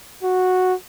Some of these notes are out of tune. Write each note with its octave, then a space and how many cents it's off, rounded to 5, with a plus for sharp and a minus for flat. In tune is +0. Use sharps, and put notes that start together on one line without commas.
F#4 -5